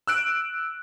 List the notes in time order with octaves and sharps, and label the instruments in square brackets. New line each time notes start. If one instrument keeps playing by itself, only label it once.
[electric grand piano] E6 F#6 D7